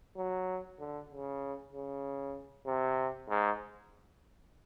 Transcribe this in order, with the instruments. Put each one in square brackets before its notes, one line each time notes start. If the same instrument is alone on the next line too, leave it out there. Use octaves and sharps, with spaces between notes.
[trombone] F#3
D3
C#3
C#3
C3
G#2